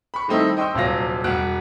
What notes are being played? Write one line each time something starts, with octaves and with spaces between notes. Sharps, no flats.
B5 C#6
D#3 G3 A3 C4 D#4 E4
D#5 G5 C6 C#6 E6
D#1 C3 F#3 F4 A#6
E1 G3 F#4 F#6